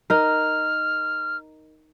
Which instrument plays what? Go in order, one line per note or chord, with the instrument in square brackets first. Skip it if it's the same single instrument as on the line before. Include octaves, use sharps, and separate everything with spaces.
[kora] D#4 A#4 [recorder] F6